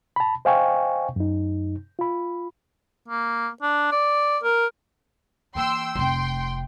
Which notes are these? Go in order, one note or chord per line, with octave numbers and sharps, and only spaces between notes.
A5 B5
C5 D#5 F5 G5 G#5 C#6
F#2 D#4
F4 B5
A#3
D4
D5
A#4
E3 A#3 G5 C6 E6
F1 C4 G5 C6